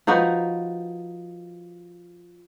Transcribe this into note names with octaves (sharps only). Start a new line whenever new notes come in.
F3 D#4 F#4 B4